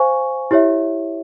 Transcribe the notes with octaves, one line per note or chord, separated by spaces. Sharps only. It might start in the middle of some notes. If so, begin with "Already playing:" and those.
Already playing: C5 F5 G#5 C#6
E4 G4 C#5 E5